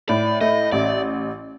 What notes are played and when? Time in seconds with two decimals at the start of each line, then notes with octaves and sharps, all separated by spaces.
0.09 A2 D5
0.41 A3 D#5
0.72 A1 D5